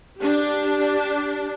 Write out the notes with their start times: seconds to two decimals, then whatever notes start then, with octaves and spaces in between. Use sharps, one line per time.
0.19 D4 G4